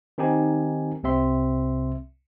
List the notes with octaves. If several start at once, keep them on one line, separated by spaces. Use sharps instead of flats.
D#3 C4 D#4 G4 G#5
C2 C3 C4 E5 C6